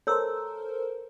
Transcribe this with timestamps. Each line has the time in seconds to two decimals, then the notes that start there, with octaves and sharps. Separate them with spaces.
0.07 A4 A#4 C5 C#5 E6